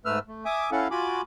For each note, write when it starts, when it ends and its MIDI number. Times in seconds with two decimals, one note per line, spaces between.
0.05 0.19 44
0.05 0.19 57
0.05 0.19 71
0.05 0.19 88
0.05 0.19 89
0.28 0.45 57
0.45 0.70 76
0.45 0.70 80
0.45 0.70 86
0.45 0.70 87
0.72 0.88 61
0.72 0.88 64
0.72 0.88 69
0.72 0.88 77
0.72 0.88 78
0.91 1.22 65
0.91 1.22 66
0.91 1.22 80
0.91 1.22 83
0.91 1.22 86